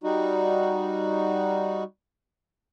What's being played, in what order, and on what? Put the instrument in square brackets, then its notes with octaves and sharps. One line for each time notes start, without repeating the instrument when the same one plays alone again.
[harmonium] G3 D#4 F#4